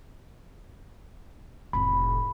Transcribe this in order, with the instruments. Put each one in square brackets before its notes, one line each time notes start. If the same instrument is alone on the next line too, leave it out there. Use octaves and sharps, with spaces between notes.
[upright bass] F1 A2 [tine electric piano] B5